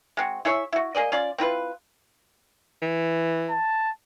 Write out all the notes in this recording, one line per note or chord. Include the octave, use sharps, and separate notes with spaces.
G#3 C4 F#4
E4 G#4 C#5 E5
E4 F#4
A#3 G#4 D5 D#5
C#4 F4 D5
C4 E4 F4 B4
E3
A5